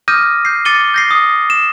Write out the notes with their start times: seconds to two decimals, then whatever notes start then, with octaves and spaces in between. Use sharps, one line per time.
0.08 D6 D#6 F6 G6 A#6 D#7
0.45 G6 C7
0.65 D6 A6 C#7 D#7 G7
0.94 G6 A#6 C7
1.11 D#6
1.50 E7